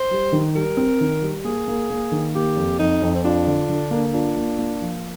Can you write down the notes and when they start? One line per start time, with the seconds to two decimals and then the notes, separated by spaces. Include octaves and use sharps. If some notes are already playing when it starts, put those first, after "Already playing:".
Already playing: C5
0.11 G3
0.32 D#3
0.55 G3 A#4
0.77 C4
1.01 D#3
1.22 G3
1.44 A#3 G#4
1.68 A#3
1.90 A#3
2.12 D#3
2.34 A#3 G4
2.56 F2
2.79 F2 D#4
3.02 F2
3.15 C4
3.24 D4 F4
3.47 D3
3.69 D3
3.91 A#3
4.13 D4 F4
4.37 A#3
4.59 A#3
4.82 F3